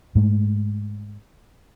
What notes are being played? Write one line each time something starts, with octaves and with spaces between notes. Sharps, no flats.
G#2 G#3 A3